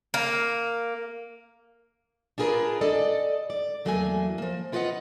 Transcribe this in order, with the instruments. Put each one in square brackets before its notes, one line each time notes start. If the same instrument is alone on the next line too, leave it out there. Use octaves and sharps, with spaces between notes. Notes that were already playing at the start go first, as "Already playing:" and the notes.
[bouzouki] A#3
[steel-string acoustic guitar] D4 F4 G#4 A#4 B4
A4 D5 D#5
D5
E2 F#3 A3 A#3 D5 G#5
F3 A#3
E4 F4 B4 D5 D#5 F#5